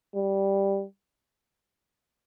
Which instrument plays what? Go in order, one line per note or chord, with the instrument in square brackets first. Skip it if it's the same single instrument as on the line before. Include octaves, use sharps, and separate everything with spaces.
[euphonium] G3